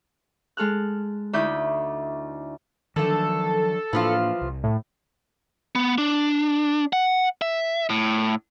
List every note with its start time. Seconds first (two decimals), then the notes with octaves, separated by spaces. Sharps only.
0.57 G#3 A4 F6 F#6
1.33 D2 D#4 E4 B5 D6 G6
2.96 D3 D#3 F3 F#3 A3 A4
3.93 A2 E3 F3 A#3 D4 F4
4.41 C2
4.64 A2
5.75 B3
5.98 D4
6.93 F#5
7.42 E5
7.90 A2